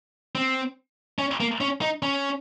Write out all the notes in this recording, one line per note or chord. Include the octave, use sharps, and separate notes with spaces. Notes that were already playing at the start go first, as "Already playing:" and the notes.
C4
C#4
A#3
C#4
D#4
C#4